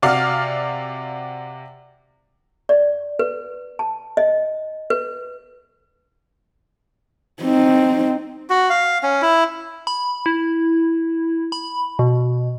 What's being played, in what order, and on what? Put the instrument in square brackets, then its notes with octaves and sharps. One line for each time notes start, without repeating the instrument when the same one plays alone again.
[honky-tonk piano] C3 F#4 D5 F5 F6
[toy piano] D5
B4
A5
D#5
B4
[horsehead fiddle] C4 D#4
[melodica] F#4
F5
C#4
E4
[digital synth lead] B5
E4
B5
B2